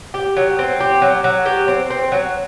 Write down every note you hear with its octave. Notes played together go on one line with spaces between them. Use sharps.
G4
F#3
C4
G4
F#3
F#3
G4
C4
C4
F#3